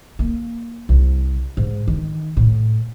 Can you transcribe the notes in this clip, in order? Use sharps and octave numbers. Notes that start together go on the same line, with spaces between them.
A#3
C2
G#2
D#3
A2